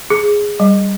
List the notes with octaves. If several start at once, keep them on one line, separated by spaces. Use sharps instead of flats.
G#4
G3